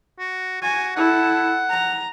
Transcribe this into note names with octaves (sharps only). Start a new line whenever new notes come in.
F#4
F#4 G#5
E4 A4 F#5
A#5